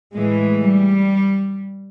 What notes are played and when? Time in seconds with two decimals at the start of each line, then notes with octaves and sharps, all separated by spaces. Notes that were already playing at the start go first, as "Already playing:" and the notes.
0.14 A2 E3 G#3
0.61 G3